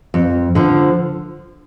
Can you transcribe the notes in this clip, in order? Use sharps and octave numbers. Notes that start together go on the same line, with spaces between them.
F2
D3 F3